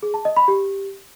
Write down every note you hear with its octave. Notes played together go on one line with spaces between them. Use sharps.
G#4
A5
D#5
B5
G4